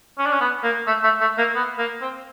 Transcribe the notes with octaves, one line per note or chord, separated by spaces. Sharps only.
C#4
D4
C#4
B3
A#3
A3
A3
A3
A#3
B3
A#3
C4